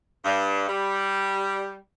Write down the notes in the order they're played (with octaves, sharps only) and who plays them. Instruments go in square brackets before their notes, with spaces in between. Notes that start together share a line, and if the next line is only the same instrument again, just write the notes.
[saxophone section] G2
G3